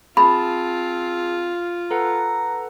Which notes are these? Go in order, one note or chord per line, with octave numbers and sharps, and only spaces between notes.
C4 F4 G#4 A5 B5
A4 B4 F#5 A#5